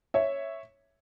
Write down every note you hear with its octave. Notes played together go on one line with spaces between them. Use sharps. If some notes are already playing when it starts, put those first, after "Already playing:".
C#5 E5